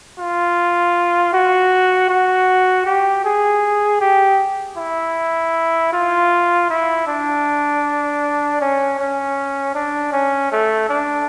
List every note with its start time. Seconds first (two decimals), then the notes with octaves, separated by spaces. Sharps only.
0.19 F4
1.33 F#4
2.10 F#4
2.86 G4
3.25 G#4
4.01 G4
4.77 E4
5.93 F4
6.70 E4
7.07 D4
8.61 C#4
8.99 C#4
9.75 D4
10.13 C#4
10.52 A3
10.89 D4